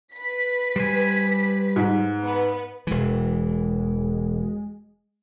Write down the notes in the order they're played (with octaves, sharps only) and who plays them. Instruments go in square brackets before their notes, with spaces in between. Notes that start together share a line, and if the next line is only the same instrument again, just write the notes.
[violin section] B4 B6
[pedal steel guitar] G3 C5 G#5
[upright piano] G#2
[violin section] B3 B4
[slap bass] E1 E3 [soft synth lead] G#3